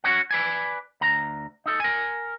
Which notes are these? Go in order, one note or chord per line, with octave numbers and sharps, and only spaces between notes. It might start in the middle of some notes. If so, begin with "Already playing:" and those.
C#4 F#4 C#5 F#5
B4 D5 G#5
D2 A#5
D#4 A4
A#4 G#5